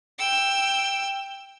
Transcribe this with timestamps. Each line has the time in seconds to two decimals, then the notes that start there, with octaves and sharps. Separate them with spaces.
0.19 G5 E6